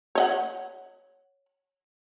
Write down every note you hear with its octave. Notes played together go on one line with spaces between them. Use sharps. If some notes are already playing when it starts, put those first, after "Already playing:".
C#5 D#5 F#5